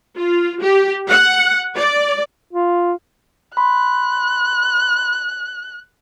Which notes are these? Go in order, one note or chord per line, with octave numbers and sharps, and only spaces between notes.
F4
G4
F#5
D5
F4
B5 C6 F#6